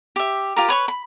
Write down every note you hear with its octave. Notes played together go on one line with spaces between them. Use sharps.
G4 E5
F4 G4 A#4
B4 C#5 C#6
B5